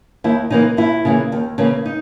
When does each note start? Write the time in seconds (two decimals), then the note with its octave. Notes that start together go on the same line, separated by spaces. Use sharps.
0.24 D#2 E4
0.50 C#3 E3 A#3 D#4
0.77 D#2 E4
1.05 C#3 E3 A#3
1.32 D#2
1.58 C#3 E3 A#3
1.86 D#4